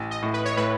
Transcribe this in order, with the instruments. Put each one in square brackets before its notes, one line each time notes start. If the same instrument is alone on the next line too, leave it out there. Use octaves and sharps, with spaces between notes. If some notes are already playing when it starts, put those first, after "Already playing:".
Already playing: [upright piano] A1
[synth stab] D#5
[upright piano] A2
[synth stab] B4
C#5
[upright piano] A2 [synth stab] B4